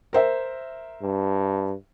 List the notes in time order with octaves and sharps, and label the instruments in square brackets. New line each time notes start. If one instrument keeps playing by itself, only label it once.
[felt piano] A#4 C5 E5
[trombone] G2